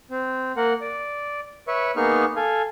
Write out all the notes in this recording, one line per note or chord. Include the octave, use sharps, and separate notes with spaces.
C4
A#3 A#4 F#5
D5
B4 C#5 E5 C#6
A#3 B3 D#4 G#4 C#6 F6
A4 F5 G#5